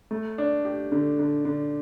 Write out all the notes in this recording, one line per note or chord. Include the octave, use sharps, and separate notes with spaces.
A3
D4
G4
D3
D3
D3